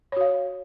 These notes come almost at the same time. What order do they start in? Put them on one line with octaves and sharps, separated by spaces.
C#5 F#4 F5